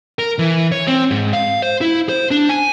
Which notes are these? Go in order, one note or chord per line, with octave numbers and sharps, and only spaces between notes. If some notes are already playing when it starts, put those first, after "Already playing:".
A#4
E3
C#5
C4
G#2
F5
C5
E4
C5
D4
G#5